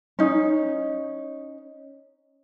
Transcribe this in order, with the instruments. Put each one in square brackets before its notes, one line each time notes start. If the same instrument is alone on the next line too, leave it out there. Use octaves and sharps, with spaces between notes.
[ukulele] C#4 D#4